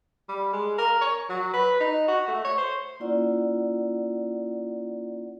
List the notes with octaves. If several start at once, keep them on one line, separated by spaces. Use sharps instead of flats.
G3
G#3
A#4
C#5
F#3
B4
D#4
F#4
A3
C#5
C5
A#3 C#4 E4 F4 D5 F#5